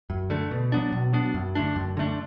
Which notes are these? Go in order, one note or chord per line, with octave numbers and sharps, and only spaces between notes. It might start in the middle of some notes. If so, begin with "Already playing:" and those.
F#2
D3 A3
B2
F#3 B3 D4
B2
F#3 B3 D4
F#2
D3 A3 D4
F#2
D3 A3 D4